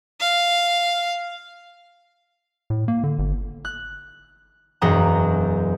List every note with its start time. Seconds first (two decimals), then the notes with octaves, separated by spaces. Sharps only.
0.20 F5
2.70 A2
2.88 A#3
3.04 D3
3.19 G1
3.65 F#6
4.81 E1 F#2 F#5 G5 A#5 D#6